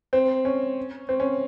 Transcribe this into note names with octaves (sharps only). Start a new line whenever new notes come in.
C4
C#4
C4
C#4